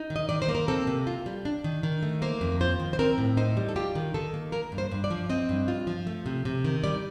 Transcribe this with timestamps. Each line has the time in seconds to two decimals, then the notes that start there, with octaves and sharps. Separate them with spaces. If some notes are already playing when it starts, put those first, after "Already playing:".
Already playing: D#4
0.10 D#3
0.16 D#5
0.29 D#3 D5
0.42 C5
0.48 A#3
0.55 A#4
0.68 C4 A4
0.87 C3
1.07 F4
1.26 G3
1.45 D4
1.64 D#3
1.83 D#3
2.03 A3
2.22 A#3 C5
2.41 F2
2.61 F4 C5
2.80 D#3
2.93 C5
2.99 C4 A#4
3.18 A2
3.37 D#4 C5
3.57 G3
3.69 A4
3.76 F4 G4
3.95 D#3
4.14 D#3 A4
4.34 A#3
4.52 A#3 A#4
4.72 G2
4.78 C5
4.91 G2
5.04 D5
5.11 F3
5.30 C4 D#5
5.49 G2
5.68 F4
5.87 F3
6.07 A3
6.26 C3
6.45 C3
6.64 D#3
6.84 G3 D5